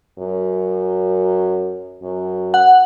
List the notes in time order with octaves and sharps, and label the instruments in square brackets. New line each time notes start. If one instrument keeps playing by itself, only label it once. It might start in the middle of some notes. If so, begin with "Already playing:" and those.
[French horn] F#2
F#2
[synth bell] F#5